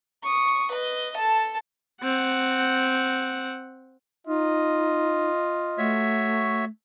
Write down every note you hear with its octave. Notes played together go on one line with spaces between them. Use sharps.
C#6 D#6
B4 D#5
A4 A5
C4 F#5
D#4 F4 D#5
A3 F#4 C#5 E5